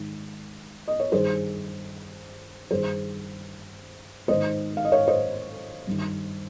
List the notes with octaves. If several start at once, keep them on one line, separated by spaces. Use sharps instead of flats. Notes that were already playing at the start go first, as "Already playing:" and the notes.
Already playing: G#2 D#3
D#5
C#5
G2 D#3 G#4 C5
G2 D#3 G#4 C5
G#2 D#3 C5 D#5
F5
D#5
C#5 F5
C5 D#5
G2 D#3